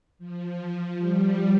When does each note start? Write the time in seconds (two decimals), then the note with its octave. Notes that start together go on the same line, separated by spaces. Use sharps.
0.19 F3
0.97 G3